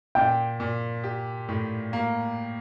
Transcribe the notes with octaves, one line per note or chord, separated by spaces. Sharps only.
A#2 G5
A#2
G4
A2
A#3